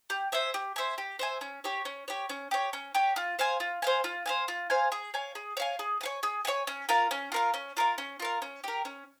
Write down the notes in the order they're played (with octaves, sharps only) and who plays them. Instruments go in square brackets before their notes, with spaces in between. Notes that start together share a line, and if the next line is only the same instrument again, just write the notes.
[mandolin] G4
C5 E5 G#5
G4
C5 E5 G#5
G4
C5 E5 G#5
C#4
G4 C#5
C#4
G4 C#5
C#4
G4 C#5
C#4
G4 C#5
F4
C5 F5 G#5
F4
C5 F5 G#5
F4
C5 F5 G#5
F4
C5 F5 G#5
G#4
C#5 F5 G#5
G#4
C#5 F5 G#5
G#4
C#5 F5 G#5
G#4
C#5 F5 G#5
C#4
F4 A#4 F5
C#4
F4 A#4 F5
C#4
F4 A#4 F5
C#4
F4 A#4 F5
C#4
G4 A#4
C#4